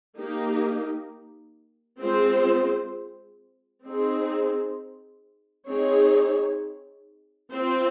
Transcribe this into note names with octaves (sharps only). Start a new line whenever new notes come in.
A#3 D#4 G4
G#3 C4 F4 C5
C4 D#4 G#4
C4 D#4 G#4 C#5
C4 F4 C5